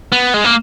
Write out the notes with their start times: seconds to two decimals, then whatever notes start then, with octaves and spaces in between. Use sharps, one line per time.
0.12 B3
0.34 G#3
0.44 A#3